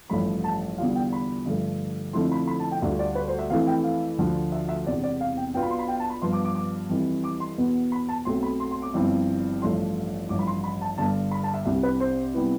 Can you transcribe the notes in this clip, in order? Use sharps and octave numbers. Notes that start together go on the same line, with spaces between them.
A1 G2 F3 A3 B5
A5
E2 D3 G3 D4 F4 F5
G5
B5
G2 D3 F3 A3
F2 D3 F3 A3 E4 C6
B5
B5
A5
G5
D2 D3 G3 D4 F4 E5
D5
B4
C5
E5
F2 E3 A3 E4 F5
G5
F5
D2 D3 F3
E5
E5
E1 E2 C3 D5
D5
F5
G5
B1 B2 B3 D4 F4 G5
B5
C6
B5
G5
A5
B5
G2 F3 B3 C6
D6
D6
D6
F2 E3 G3
D6
C6
E2 B2 B3
B5
A5
B1 B2 A3 C4 C6
B5
C6
C6
D6
G1 G2 F3 C4 E4
A1 G2 F3 A3 D4 C6
A1 G2 F3 D6
B5
C6
B5
A5
G1 G2 D3 A5
B5
A5
E5
C2 C3 G3 D4 E5
B4
C5
C3 G3 B3 E4